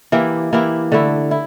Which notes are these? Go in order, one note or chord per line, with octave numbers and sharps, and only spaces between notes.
E3 A#3 E4 G4
E3 A#3 E4 G4
D3 A3 E4
E4